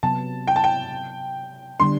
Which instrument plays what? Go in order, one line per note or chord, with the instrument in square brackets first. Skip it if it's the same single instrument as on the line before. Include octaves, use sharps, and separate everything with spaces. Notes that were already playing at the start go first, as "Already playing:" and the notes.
[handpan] C3 F#3 B3 [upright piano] A5
[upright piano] G5
A5
G5
[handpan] D3 G3 B3 D4 [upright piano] C6